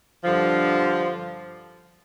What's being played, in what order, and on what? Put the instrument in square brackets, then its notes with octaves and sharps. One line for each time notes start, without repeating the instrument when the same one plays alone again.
[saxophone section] G2 D3 F3